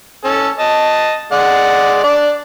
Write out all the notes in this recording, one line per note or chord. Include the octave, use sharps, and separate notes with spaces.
C#4 A4
D#5 A5
G#3 D5 F#5
D4 D5